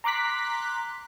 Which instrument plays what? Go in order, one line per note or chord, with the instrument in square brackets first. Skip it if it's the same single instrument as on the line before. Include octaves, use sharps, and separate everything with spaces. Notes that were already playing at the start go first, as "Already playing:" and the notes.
[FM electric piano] A#5 C6 D6 F#6 B6